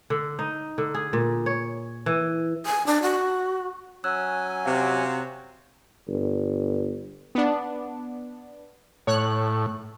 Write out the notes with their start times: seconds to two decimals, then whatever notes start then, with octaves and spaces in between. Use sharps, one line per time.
0.10 D3
0.39 D#4
0.78 D3
0.94 G#4
1.13 A#2
1.46 C#5
2.06 E3
2.66 G#5
2.87 D4
3.02 F#4
4.04 F#3 C#4 G#5 E6 F#6
4.65 C3 F#4 F5
6.08 G1
7.35 B3 D4
9.07 A2 C#5 F#6